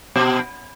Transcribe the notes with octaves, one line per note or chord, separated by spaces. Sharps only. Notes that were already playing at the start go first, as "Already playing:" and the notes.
B2